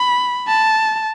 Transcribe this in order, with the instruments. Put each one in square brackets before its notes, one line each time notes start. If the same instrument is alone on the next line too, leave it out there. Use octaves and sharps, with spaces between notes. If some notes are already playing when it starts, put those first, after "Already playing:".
Already playing: [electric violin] B5
A5